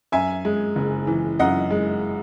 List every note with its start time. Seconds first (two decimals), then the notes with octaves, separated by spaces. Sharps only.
0.12 F#2 E5 G#5
0.45 G#3
0.76 F#1
1.07 E3
1.39 F#2 D#5 F#5
1.71 G#3